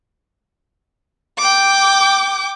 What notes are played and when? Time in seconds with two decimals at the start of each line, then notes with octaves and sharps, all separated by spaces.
1.38 G5 D6